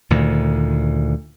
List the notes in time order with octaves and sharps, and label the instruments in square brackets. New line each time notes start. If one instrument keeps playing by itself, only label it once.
[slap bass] D2 A#2 D#3